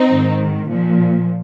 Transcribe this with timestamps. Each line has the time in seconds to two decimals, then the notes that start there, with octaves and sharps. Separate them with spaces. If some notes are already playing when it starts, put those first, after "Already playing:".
Already playing: C4 D#4
0.10 G#2 D#3
0.68 A#2 F3